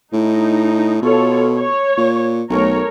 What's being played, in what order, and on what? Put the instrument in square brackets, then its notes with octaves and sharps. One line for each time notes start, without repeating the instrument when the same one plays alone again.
[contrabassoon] A2 [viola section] D#4
[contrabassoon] B2 [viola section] F4 A4 C#5
[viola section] C#5
[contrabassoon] A#2
[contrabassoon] B1 [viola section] A3 A#4 C#5